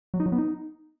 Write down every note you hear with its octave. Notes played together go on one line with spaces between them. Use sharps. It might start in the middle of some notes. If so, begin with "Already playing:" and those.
F#3
D#4
F#3
B3
D#4